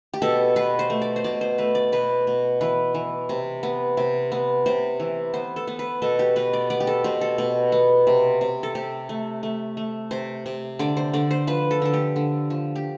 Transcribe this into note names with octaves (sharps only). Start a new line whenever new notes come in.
G4
B2 A4
B2 B4
C5
A3
D5
C5
B2 D5
C5
A3 B4
D5
B2 B4
B2
E3 B4
E3
C3
B3
C3
B3
C3 C5
E3
B3 C5
A4
B3
B4
B2 A4
G4
B2 B4
D5
B3 D5
G4
A4
B2 C5
A4
B2
B3
C3
C3
A4
C3 G4
A3
A3
A3
C3 C5
C3
D3 D5
C5
D3 D5
C5
F3 B4
A4
D3 A4
G4
D3
F3
G4